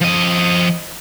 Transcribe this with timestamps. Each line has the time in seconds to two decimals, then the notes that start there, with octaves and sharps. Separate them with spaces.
0.01 F3 D#5